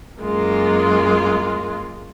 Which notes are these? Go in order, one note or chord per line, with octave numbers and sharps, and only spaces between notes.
F#2 G#3 A#3 F4